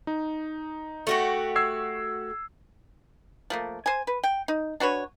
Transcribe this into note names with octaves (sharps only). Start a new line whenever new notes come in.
D#4
A3 F#4 G4
E6 G#6 C7
F3 A3 A#3
C5 G#5
B4
G5
D#4
D4 F#4 B4 C#5